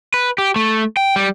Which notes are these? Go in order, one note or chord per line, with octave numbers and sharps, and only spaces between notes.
B4
G4
A3
G5
G3